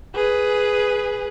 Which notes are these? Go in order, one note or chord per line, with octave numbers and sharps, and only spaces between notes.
G#4 B4